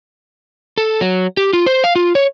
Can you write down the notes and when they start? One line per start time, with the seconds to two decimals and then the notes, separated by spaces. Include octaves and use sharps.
0.78 A4
1.01 F#3
1.37 G4
1.53 F4
1.66 C5
1.84 F5
1.96 F4
2.15 C#5